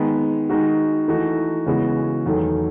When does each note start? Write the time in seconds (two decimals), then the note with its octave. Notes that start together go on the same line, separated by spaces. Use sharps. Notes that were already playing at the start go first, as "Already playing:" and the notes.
Already playing: D#3 G#3 B3
0.50 D#3 G#3 D#4 F#4
1.08 E3 A3 D#4 F#4
1.66 C#3 E3 G#3 B3 F#4
2.26 E2 D#3 F#3 A3